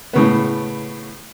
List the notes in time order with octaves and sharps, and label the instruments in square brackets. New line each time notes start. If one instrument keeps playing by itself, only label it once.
[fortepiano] A2 C#3 B3